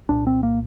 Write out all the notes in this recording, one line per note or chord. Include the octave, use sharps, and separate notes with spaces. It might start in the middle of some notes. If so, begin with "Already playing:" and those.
C2 A#2 D4
C4
A#3